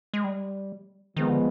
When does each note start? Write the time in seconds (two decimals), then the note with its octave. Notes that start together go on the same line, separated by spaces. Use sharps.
0.13 G#3
0.24 G3
1.16 D#3 F3 G#3 B3
1.30 D3